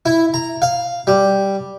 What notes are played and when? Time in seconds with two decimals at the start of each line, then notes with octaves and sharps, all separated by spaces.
0.06 E4
0.34 A#5
0.62 F5
1.07 G3